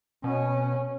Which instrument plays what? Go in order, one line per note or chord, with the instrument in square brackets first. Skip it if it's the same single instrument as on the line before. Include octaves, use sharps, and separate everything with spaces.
[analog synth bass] B2 [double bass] C#4